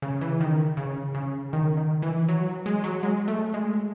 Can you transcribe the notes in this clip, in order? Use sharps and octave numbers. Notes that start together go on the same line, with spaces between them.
C#3
E3
D#3
C#3
C#3
D#3
D#3
E3
F#3
G#3
F#3
G#3
A3
G#3